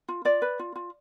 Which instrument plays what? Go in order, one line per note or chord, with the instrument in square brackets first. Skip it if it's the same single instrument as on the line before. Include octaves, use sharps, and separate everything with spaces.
[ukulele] F4
F4 D5
B4
F4
F4